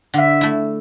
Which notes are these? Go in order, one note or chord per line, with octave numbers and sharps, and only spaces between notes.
D3 E5 F#5
A3 E4